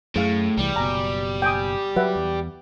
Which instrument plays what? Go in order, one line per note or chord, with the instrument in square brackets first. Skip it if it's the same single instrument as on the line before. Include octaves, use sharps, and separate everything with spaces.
[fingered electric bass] F#2 [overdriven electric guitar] A2 [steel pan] G#4 F5
[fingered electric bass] C2 E3 [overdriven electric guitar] G3
[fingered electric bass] F#1 B2 [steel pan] G#5 A#5
[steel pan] G5 G#5 D#6
[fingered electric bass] F#3 [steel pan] B4 E5 F#5
[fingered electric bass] E2